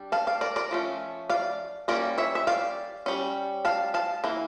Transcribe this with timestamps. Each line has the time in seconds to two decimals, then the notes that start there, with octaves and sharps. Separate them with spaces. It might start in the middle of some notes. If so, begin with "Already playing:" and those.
Already playing: G3 D4
0.12 F5 A5
0.27 D5 F5
0.41 A#4 D5
0.56 A#4 D5
0.71 F3 A3 C#4
1.30 D5 F5
1.88 G3 A#3 C#4 A#4 D5
2.18 C#5 E5
2.35 E5
2.47 D5 F5
3.06 G3 C#4
3.65 F5 A5
3.94 F5 A5
4.24 E3 A#3